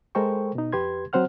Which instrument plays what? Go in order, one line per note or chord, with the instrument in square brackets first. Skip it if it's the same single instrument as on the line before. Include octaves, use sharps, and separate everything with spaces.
[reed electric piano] G#3 A4 A#4 C5 G5 C#6
B2 D#4
F2 G4 B4 C6 G#6
F#3 C4 C5 F#5 F6